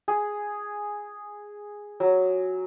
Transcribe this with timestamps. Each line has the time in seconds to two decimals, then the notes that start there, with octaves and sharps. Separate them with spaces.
0.08 G#4
2.00 F#3